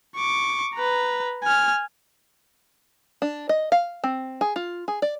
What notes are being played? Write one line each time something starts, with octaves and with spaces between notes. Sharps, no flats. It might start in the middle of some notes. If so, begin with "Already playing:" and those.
C#6 D6
B4 A#5
G#5 F6
D4
D#5
F5
C4
G#4
F4
G#4
D5